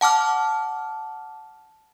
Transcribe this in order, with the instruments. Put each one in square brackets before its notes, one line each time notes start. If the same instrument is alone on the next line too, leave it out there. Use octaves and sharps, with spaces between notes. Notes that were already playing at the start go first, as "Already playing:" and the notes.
[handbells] F#5 A5 D6 F6